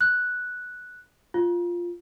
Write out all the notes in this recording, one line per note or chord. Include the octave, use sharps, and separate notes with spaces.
F#6
F4